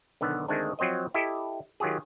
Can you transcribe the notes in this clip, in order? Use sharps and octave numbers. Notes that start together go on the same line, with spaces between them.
B1 D3 D#3 B3
D2 D#3 G#3 A3 C4 D4
F3 F#3 C4 C5 D#5
E4 G4 A4 D#5
D#3 F#3 F4 G4 G#4